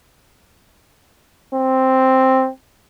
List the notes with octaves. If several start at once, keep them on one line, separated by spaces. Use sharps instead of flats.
C4